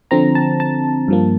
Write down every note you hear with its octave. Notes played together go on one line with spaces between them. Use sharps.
D3 F3 C4 A#5
A5
A5
G2 F3 A#3